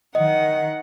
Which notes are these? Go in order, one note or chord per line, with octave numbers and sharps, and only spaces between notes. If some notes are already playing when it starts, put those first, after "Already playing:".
D#3 D#5 F#5